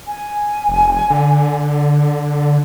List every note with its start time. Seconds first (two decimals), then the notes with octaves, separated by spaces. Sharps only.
0.07 G#5
0.69 F1
1.10 D3
2.34 D4